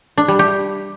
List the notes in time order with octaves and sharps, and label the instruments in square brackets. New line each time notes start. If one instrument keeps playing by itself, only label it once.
[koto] D4
G3
G4